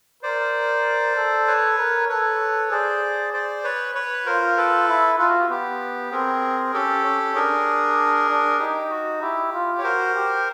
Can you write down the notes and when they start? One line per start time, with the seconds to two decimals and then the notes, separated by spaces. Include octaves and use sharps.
0.23 A#4 C5 D5
1.16 A4
1.47 B4 C#5
1.78 A#4
2.09 A4 B4 C#5
2.71 G#4 C5 D5
3.33 C5 D5
3.64 B4 C#5
3.95 B4 C#5
4.26 F4 A#4 C5
4.57 A4 B4
4.88 E4
5.19 F4 A4 B4
5.29 F#4
5.40 G4
5.50 B3 G4
6.11 C4 G#4 A#4
6.74 C#4 G4 A4
7.05 C#4
7.35 D4 G#4 A#4
8.29 D4
8.59 D#4 G4
8.91 F#4
9.22 E4 G4
9.53 F4
9.78 C#5
9.83 F#4 A#4 C5
10.15 G4